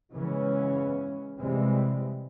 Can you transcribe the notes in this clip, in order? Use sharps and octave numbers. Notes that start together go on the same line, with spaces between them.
C#3 E3 G#3 B3 C#4
C3 E3 G3 G#3 C4